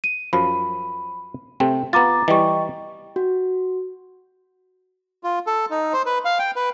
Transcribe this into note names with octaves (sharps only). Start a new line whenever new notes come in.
D#7
F#2 F3 B5
C3 A3 C4 G5
B3 F4 A#5 D6 A6
E3 G3 D#5 G5 C#6
F#4
F4
A4
D#4
C5
B4
F5
G5
B4